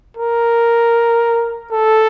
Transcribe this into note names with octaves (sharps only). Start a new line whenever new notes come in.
A#4
A4